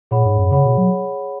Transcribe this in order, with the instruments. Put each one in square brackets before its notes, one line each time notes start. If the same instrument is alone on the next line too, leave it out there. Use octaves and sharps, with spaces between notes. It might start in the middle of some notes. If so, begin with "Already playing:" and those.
[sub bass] A#2 [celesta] G#4 C#5 F#5 B5
[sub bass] G#2
F#2
[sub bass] C#3 [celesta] G#4 C#5 F#5 B5
[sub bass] B2
F#3